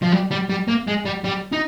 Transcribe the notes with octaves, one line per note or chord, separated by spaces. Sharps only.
F3
G3
G3
G3
A#3
G#3
G3
G3
D#4